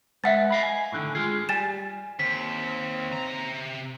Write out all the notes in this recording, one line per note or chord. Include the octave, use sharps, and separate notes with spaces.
G#3 B4 E5 F#5 A6
D#5 F5 B5
G#5
A2 D3 D#3
G#3 F4 G#4
G3 G#5 A6 E7
D#2 C4 B6
C3 A#5